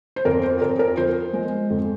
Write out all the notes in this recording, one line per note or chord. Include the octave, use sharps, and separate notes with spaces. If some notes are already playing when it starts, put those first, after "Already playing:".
C5
F2 A#4
C5
F2 A#4
A#4
F3 C5
G#3
F2